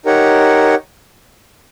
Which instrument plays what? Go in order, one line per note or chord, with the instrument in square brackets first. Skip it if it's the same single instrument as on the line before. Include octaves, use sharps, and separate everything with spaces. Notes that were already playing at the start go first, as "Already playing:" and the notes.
[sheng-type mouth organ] D#4 G4 A#4 C#5 F#5